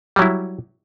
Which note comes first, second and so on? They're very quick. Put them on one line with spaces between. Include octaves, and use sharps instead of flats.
G3 F#3 E4